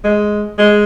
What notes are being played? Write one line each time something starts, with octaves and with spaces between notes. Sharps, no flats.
G#3
G#3